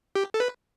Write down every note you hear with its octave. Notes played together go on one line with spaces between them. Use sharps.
G4
A4
B4